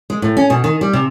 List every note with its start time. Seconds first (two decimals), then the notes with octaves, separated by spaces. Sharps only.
0.10 G#3
0.22 A2
0.37 C#4
0.50 B2
0.64 D#3
0.81 G3
0.93 C3